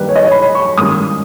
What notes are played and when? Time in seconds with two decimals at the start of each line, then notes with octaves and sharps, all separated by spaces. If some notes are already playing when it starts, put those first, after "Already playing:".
Already playing: G2 D#3 G3 A#3 B4
0.09 C#5
0.16 D#5
0.23 C#5
0.31 B5
0.55 C#6
0.78 G#2 D#3 G3 A#3 C#4 D#6